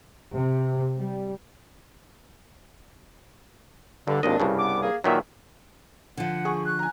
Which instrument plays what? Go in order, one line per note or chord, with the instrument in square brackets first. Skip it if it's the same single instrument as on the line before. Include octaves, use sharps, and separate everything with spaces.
[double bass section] C3
G3
[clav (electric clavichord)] G2 [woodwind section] D3
[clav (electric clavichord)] G#1 D#2 D#5 [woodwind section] A#2 D4
[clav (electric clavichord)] C2 G2 C#3
[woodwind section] B3 D6
A#3 G#4
[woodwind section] E2 E5 [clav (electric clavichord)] A#2 D#3 F#3
[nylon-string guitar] D3 F3 [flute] F#5
[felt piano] G#4 C#6
[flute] F#6
[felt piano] G#5 A#5